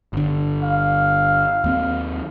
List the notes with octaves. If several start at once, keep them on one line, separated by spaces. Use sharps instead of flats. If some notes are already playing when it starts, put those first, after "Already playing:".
G1 D3
F5
D#2 A#3 C4